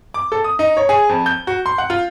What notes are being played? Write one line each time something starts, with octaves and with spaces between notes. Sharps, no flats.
D6
A4
D#6
D#4
C#5
G#4
F2
G6
F#4
C6
F#5
F4